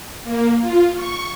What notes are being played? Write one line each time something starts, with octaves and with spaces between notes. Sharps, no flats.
A#3
F4
C#6